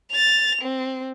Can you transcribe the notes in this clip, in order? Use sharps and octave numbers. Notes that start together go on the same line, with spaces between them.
A6 F7
C4